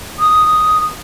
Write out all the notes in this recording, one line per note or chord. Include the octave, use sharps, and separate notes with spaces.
D#6